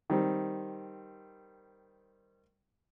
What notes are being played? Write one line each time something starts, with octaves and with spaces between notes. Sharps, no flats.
D#3 G3 C4